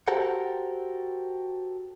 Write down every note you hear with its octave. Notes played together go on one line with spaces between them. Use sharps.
F#4 G4 A4 A#4 C5 F#5